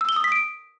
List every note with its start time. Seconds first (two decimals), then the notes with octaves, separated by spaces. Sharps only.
0.01 E6
0.09 G7
0.16 D#6
0.24 B6
0.32 D7